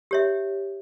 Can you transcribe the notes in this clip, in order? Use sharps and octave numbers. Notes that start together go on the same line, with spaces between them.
G4 C#5 E5